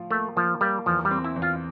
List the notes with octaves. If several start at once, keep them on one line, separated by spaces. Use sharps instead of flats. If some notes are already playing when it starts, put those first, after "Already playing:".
Already playing: A2 F3 F4
A3 A#3
F3 A#3
G3 A#3
E2 F3
G3
C4
E4
E2
F4